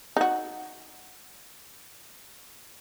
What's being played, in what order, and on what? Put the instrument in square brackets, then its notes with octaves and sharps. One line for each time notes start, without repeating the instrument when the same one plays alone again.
[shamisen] D#4 F#4